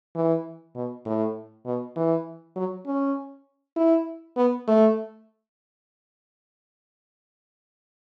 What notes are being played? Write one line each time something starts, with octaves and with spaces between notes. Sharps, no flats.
E3
B2
A2
B2
E3
F#3
C#4
E4
B3
A3